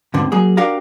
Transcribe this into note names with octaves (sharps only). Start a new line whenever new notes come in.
D2 G#2 D3 B3 C4
F#3 A#3 G#4
D4 F#4 G4 A#4 F5 A#5